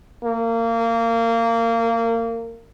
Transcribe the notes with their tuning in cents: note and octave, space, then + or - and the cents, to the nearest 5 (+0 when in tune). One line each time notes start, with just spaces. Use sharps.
A#3 -25